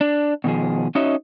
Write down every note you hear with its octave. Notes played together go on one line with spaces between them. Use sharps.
D4
B2 D#3 F3 G#4
C#4 D#4 F#4 C#5 D#5 E5